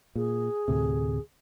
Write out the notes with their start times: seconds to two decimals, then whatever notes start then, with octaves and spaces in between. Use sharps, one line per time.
0.15 A#2 G#4
0.68 D2 A2 C3